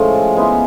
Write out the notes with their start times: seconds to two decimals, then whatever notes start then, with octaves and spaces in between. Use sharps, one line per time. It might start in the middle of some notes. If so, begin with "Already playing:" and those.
Already playing: A2 F3 G#3 C#4
0.36 G#3 B3 E4